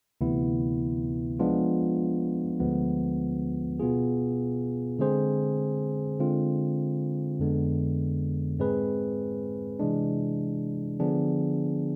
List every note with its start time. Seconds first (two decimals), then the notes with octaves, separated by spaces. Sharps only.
0.21 D2 C3 E3 B3 E4
1.39 F3 G#3 B3 D4 F4
2.60 D2 D3 F3 G#3 B3
3.80 B2 B3 F4 G#4
4.99 D3 G#3 C4 G#4 C5
6.19 D3 G#3 C4 F4
7.39 F2 D3 G#3 B3
8.59 G#2 G#3 C4 G#4 B4
9.80 C3 E3 G#3 D4
11.00 D3 F3 B3 D4 G#4